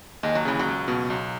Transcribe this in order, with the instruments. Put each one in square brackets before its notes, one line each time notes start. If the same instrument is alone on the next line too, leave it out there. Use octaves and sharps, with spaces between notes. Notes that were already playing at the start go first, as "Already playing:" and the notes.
[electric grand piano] D#2 [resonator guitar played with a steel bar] G#3
[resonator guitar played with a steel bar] F#3
[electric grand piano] C#3 [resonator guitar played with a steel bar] E3
[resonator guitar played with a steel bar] F#3
[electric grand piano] C#2
B2
B1